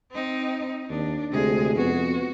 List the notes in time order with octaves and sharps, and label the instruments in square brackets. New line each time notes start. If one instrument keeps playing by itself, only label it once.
[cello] C4 D#4
[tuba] D#2 [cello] D4
[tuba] D2 [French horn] C3 [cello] G#3 G#4
[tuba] F2 [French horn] B3 [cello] F#4